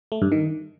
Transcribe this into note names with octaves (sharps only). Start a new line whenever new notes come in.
A3
G2
D#3